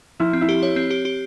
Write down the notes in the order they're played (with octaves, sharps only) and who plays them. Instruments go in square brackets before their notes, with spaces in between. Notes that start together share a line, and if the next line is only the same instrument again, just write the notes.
[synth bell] F3 [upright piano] E4
[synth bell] C4
[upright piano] E4
[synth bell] G4
C#5
C4
G4
G4